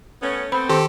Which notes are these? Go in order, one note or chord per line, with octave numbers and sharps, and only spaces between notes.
A3 B3 C#4
A3 B3 C4 B5
D#3 G4 A4 C6